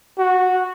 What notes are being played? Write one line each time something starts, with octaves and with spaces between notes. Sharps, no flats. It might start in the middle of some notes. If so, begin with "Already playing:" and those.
F#4